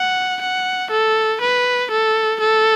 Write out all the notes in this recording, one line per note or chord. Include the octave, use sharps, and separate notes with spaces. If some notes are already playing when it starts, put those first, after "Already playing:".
Already playing: F#5
F#5
A4
B4
A4
A4